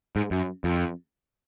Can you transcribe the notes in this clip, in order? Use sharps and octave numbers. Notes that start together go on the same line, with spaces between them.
G#2
F#2
F2